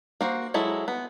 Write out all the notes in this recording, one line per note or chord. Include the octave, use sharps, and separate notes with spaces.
A#3 F#4 C5
F#3 G#3 E4 A4
B3